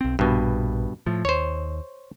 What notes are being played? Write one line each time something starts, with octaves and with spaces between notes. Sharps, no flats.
B1 C4
A#1 G2 B2
A2 F3
D#2 C5 C#5